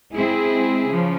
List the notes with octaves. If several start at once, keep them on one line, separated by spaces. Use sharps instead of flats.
G#3 C4 E4 G#4
C#3 F3